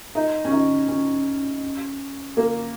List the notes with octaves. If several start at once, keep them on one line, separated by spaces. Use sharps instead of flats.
D#4
C#4
D#4
C#4
A#3